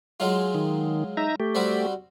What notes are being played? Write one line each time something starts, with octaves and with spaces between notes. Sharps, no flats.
F#3 G#3 F4
D#3
D#4 E5 A#5
A3 G4
G3 C4 F#4